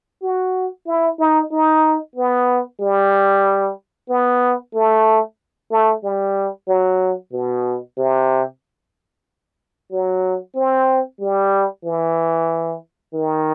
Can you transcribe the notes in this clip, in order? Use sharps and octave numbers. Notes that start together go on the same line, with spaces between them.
F#4
E4
D#4
D#4
B3
G3
B3
A3
A3
G3
F#3
B2
C3
F#3
C4
G3
E3
D#3